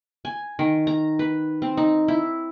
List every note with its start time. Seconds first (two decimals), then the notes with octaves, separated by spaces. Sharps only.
0.25 G#5
0.59 D#3
0.87 A#5
1.19 B4
1.62 C4
1.77 D#4
2.08 E4